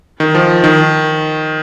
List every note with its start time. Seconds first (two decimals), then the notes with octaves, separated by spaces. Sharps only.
0.20 D#3
0.35 F3
0.64 D#3